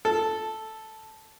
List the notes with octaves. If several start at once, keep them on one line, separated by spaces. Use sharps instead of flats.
A4